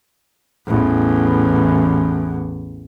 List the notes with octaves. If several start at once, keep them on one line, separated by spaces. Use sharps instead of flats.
A1 E2